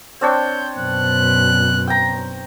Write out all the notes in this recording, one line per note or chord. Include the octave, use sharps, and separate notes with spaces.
C4 D4 C#5 G6
F#2 B2 F#6
G5 A#5